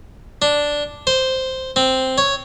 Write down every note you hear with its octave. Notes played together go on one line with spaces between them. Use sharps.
D4
C5
C4
C#5